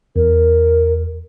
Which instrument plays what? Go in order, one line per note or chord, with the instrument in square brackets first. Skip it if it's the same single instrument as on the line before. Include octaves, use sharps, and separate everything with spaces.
[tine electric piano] E2 [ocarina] A#4